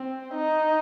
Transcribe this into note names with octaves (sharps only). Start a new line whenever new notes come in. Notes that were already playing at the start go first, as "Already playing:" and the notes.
Already playing: C4
D#4